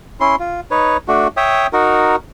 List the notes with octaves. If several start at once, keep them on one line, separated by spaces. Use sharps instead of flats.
C#4 E4 C6
F4
D#4 B4 C#5
A3 D4 F#4
C#5 E5 G5 D#6
D#4 F#4 A#4